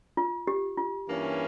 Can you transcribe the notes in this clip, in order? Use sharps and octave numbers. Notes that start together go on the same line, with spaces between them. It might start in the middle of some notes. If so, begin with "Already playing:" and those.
F4
G4
F4
G2 E3 A#3 C#4